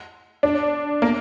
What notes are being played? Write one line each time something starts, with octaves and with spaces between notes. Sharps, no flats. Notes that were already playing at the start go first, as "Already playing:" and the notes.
D4
A#3